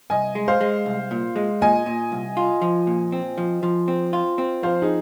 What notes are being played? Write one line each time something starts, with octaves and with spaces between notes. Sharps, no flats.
C2 D#5 G#5
G#3
C5 F5
G#3
C2
A#2
G#3
A#2 D#5 G#5
A#2
C2
F4
F3
A#2
C4
F3
F3
C4
F4
C4
F3 C5 F5
D#4 G#4